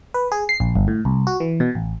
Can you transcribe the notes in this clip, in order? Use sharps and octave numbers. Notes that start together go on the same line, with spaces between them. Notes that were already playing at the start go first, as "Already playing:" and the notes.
B4
G#4
C7
A#1
G1
A2
C2
F#4
E3
B2
A1